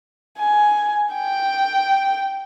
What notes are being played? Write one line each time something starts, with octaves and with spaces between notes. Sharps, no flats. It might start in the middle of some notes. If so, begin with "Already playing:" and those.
G#5
G5